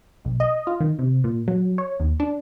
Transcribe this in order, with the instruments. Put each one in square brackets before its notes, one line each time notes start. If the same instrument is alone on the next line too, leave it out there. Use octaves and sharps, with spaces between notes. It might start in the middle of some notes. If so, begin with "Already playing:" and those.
[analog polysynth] B1
D#5
F4
D#3
C3
A#2
F#3
C#5
D#2
D4